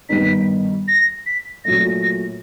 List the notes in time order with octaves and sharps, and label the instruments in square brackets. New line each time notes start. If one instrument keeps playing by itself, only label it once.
[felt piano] G2 D#3 G3 B3 D#4 [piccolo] B6
[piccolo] A#6
B6
[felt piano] A#2 F#3 A3 [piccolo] A#6